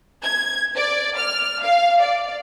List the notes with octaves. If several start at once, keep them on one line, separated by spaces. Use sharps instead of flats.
G#6
D5
F6
F5
D5